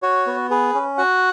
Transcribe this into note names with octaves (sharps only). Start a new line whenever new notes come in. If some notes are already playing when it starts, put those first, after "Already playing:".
F#4 C#5
B3
G#4 B4
C#4
F#4 F#5